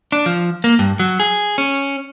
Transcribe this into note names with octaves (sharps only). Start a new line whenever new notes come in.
D4
F3
A#3
G2
F#3
G#4
C#4